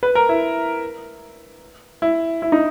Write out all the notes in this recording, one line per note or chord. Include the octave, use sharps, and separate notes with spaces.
B4
A#4
E4
E4
E4
D#4